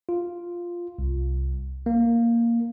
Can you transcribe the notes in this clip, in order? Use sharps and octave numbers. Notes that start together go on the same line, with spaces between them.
F4
C2
A#3